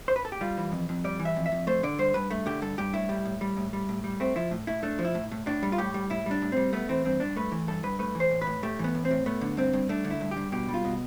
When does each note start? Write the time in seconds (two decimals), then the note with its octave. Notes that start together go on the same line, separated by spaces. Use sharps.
0.08 C5
0.16 B4
0.25 A4
0.32 G4
0.41 G3 F4
0.57 E3
0.72 F2
0.89 F2
1.04 G3 D5
1.20 E3
1.25 E5
1.36 F2
1.46 E5
1.52 F2
1.67 A3 C5
1.83 D3 D5
1.98 G2 C5
2.14 G2 B4
2.30 A3
2.46 D3 G4
2.62 G2 A4
2.78 G2 G4
2.93 A2 E4
3.09 G3
3.25 A2
3.41 G3
3.57 A2
3.73 G3
3.89 A2
4.04 G3
4.20 A3 C4
4.36 F3 E4
4.51 A2
4.67 A2 E4
4.83 A3 D4
4.99 F3
5.05 E4
5.15 A2
5.32 A2
5.46 A2 D4
5.63 G3
5.72 F4
5.78 A2 G4
5.94 G3
6.10 A2 E4
6.26 G3 D4
6.42 A2
6.52 G3 C4
6.73 A3 B3
6.89 E3 C4
7.05 G2 C4
7.20 G2 D4
7.36 A3 B4
7.52 E3
7.68 G2 A4
7.83 G2 B4
7.99 A3 B4
8.15 E3
8.20 C5
8.31 A2
8.41 B4
8.47 A2
8.63 A3 G4
8.79 E3 B3
8.95 A2
9.05 C4
9.11 A2
9.26 A3 B3
9.41 D3
9.57 G2 C4
9.73 G2
9.89 A3 D4
10.05 D3
10.10 E4
10.21 G2
10.31 G4
10.37 G2
10.52 B2 G4
10.69 G3
10.74 F4
10.85 B2